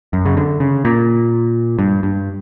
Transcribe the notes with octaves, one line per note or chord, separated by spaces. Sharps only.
F#2
C#3
D3
C#3
A#2
G2
G2